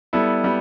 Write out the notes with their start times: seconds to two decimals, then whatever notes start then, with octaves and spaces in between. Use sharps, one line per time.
0.13 G3 B3 E4 A4
0.44 G3 B3